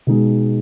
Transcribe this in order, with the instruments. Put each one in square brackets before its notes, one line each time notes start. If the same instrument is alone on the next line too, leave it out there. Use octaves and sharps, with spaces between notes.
[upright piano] B2 G#3 D#4 G#4